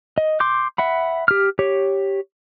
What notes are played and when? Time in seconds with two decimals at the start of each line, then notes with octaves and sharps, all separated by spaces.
0.18 D#5
0.40 C6 D6 G6
0.78 E5 F#5 B5
1.28 G4 F6
1.59 G4 C#5